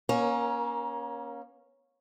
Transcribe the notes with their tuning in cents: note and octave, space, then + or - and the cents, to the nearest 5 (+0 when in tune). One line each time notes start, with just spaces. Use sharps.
A#3 +30 C#4 +0 A#4 +10